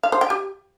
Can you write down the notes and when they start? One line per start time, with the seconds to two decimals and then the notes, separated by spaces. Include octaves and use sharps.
0.03 F5
0.12 C5
0.21 G5
0.30 G4